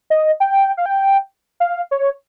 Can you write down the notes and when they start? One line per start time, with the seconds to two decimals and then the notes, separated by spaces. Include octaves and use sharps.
0.10 D#5
0.40 G5
0.77 F5
0.86 G5
1.60 F5
1.91 C#5